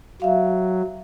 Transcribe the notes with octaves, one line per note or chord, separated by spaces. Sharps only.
F#3 E5 F5